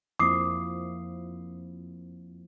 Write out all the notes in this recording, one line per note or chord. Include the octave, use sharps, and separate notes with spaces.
F2 F3 A#3 C4 E4 D6 D#6 C7